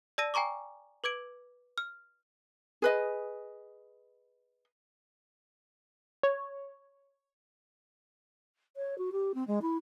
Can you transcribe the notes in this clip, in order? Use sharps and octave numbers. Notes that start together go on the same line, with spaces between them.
D5 A5 E6 A#6 D#7
G5 G#5 A#5 C#6 D6
B4 D6 G#6 D7
F6
G#4 B4 D#5
C#5
C#5
F#4
G4
C4
G#3
E4